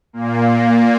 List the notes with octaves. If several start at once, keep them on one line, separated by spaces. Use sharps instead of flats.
A#2 A#3